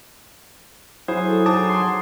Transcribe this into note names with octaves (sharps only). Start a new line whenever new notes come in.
F#3 E4 G#4 C5
A4
D#4 A5 D6 D#6 A6
C6